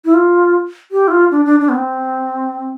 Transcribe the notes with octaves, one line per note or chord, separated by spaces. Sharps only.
E4
F4
G4
E4
F4
D4
D4
D4
B3
C4